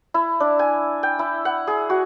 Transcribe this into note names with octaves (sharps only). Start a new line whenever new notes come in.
E4
D4
G#5
G5
E4
F#5
G#4
F#4